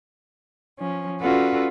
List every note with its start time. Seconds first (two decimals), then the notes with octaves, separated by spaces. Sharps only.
0.78 F3 C#4
1.22 C#4 F4 F#4 A4 B4 D5